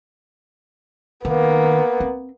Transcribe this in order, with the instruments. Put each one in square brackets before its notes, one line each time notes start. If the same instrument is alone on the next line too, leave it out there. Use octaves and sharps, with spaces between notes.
[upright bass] D#3 [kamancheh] A#3 B3
[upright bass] C4